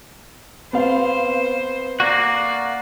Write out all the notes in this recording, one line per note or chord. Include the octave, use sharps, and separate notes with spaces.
B3 C4 C5 F5
A#3 F#4 D5